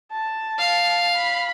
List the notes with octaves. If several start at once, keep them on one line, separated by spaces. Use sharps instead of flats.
A5
F5
B5